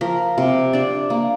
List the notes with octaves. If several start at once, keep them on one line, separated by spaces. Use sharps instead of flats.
F3 A#4
C3
D4 D5
A#3